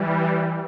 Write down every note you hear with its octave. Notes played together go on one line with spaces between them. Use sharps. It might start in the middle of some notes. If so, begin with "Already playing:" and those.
Already playing: E3 G3